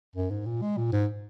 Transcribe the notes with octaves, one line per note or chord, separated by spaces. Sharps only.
F#2
G#2
A#2
G#3
A#2
G#2